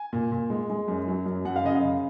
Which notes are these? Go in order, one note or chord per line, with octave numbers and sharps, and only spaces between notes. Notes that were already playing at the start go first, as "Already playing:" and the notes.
Already playing: G#5
A#2
A#2
G#3
G#3
F#2
F#3
F#2
F#2 F#5
F5
C#3 D#5
F5
C#3